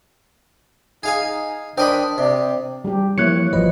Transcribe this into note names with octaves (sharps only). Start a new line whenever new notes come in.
D#4 G#4 F5 G#5
D4 A#4 C5 D#5 G5 B5 D#6
C3 D5
G3 G4
E3 F3 A#3 E4 C#5 F#6 C#7
G#1 F3 B4 D#5